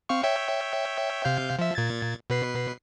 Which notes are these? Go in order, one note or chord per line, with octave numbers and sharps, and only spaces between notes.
C4 F5 C#6
C#5 E5 G5
C3 F5 G6
F3 E5
A#2 G#6 A6
B2 B4 C7